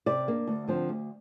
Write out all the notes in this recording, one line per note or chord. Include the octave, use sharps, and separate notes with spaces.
C3 D5
A#3 D4
D2
D3 F3 C4
D2